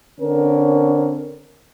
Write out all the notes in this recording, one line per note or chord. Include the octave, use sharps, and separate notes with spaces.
D3 C4 C#4 A#4